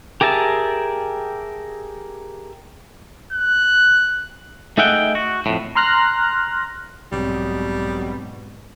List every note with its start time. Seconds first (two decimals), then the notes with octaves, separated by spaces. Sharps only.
0.21 G4 G#4 A#4 E5 A5
3.33 F#6
4.78 A3 D#4 G#4 E5 F#5 G5
5.15 F#4
5.46 F2 A2
5.75 A#5 C6 F6 F#6 A#6
7.12 B1 G#2 B2 G3 C4